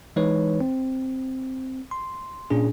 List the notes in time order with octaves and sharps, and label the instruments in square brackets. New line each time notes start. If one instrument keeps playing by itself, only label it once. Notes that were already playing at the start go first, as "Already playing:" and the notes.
[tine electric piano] E3 G#3 D#4 B4 C#5
C4
C6
A#2 C#4 D4 G#4